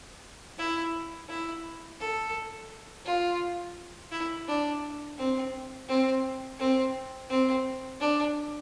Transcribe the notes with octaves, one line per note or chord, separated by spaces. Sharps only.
E4
E4
A4
F4
E4
D4
C4
C4
C4
C4
D4